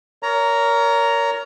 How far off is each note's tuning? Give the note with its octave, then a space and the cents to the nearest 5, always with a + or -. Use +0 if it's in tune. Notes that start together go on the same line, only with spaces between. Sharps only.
A#4 +0 C#5 +35 A#5 +0